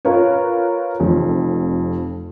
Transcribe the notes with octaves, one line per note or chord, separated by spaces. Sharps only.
F4 A#4 B4 C#5
F1 F2